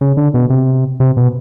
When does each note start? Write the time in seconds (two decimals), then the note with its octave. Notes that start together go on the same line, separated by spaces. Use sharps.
0.01 C#3
0.17 D3
0.34 B2
0.50 C3
1.00 C3
1.17 B2